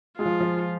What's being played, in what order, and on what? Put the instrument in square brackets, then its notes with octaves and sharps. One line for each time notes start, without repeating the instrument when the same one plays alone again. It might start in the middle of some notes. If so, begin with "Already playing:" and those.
[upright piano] G#3 [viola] F4
[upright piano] F3
F3